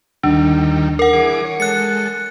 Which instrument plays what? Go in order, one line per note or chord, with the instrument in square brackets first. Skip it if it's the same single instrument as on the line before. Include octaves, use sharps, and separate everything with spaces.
[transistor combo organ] D#2 D#3 G3 [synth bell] D4
[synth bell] A#4 F#5
[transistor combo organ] E3 G#4 D6
C#5
[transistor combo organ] G#3 A4 [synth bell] F#6 C#7